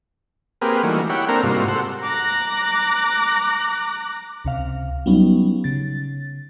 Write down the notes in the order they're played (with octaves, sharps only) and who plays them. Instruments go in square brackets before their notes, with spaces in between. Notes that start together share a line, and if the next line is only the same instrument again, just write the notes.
[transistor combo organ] A#3 C4 G4 G#4 A#4 B4
E3 G3 A3 A#3 D#4 F#4
E4 C#5 F#5 G5
A#3 C4 D4 A4 A#4 A#5
G#2 C3 G3 A#3 F4 F#4
A4 C5 F#5
[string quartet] A#5 D6 F#6 A#6
[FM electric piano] C#2 C3 F5
F#3 G3 B3 C#4 D#4
C#3 A6